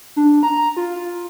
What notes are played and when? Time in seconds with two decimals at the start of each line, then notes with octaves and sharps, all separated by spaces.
0.16 D4
0.43 A#5
0.77 F4
0.96 F4